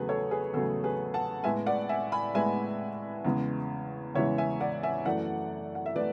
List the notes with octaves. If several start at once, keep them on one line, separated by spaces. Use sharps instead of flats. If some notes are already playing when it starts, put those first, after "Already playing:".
Already playing: E2 C#3 F#3 A3 G#4 B4
A4 C#5
G#4 B4
E2 C#3 F#3 A3 A4
G#4 B4
F#5 A5
A2 G#3 B3 E5 G#5
D5 F#5
E5 G#5
G#5 B5
A2 G#3 B3 E5 G#5
E2 C#3 E3 G#3
E2 C#3 E3 G#3 C#5 E5
E5 G#5
D5 F#5
E5 G#5
F#2 E3 A3 D5 F#5
F#5
E5
E3 A3 B4 D5